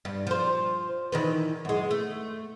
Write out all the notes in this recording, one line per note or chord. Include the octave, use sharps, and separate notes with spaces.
G2
F3 C5
D#3 E3 B4
F#2 G#3
A3